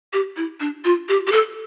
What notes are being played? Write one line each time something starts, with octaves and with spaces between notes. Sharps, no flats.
G4
E4
D4
F4
G4
G4
A4